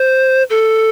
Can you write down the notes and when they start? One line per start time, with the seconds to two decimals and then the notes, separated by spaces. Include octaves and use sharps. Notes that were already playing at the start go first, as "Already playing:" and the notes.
Already playing: C5
0.50 A4